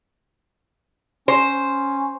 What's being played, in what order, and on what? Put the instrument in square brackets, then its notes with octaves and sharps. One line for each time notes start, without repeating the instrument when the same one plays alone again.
[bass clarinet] C#4 [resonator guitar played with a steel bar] C5